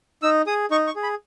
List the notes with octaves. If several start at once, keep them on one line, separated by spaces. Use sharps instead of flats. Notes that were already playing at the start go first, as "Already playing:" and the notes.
D#4 E6
G#4 D#6
D#4 C#6
C#6
G#4
B5